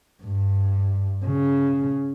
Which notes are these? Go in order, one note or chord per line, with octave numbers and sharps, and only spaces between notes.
G2
C#3